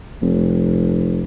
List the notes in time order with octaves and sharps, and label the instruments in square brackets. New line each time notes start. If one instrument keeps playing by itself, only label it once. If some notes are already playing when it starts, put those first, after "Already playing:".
[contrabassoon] F1